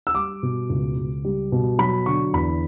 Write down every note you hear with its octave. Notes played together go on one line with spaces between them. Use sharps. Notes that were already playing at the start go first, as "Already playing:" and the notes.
E6
G3 D6
B2
C#2
C#2
G3
B2
F#3 B5
D3 C#6
E2 B5